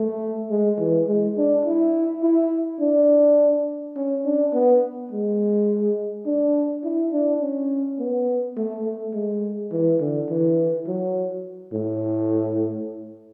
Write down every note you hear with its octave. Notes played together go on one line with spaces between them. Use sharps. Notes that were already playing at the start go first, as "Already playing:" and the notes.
Already playing: A3
G#3
E3
G#3
D4
E4
E4
D4
C#4
D4
B3
G#3
D4
E4
D4
C#4
B3
A3
A3
G#3
E3
D3
E3
F#3
A2